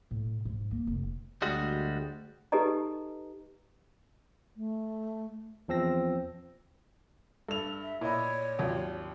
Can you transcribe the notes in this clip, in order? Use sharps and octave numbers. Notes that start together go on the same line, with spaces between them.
A2
G#2
A#3
F1
D2 G3 G#3 F#4
D#4 G4 A4 B4 D#5 A#5
A3
E2 F3 C4 E6 A#6
G2 A4 F7
E5
A#2 E4 C#5 D#5
G#1 D#2 F#3 F4